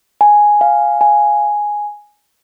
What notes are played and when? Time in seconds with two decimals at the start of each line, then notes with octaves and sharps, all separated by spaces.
0.21 G#5
0.61 F5
1.01 G#5